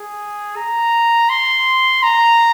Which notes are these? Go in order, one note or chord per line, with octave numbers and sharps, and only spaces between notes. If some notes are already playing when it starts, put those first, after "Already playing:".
Already playing: G#4
A#5
C6
A#5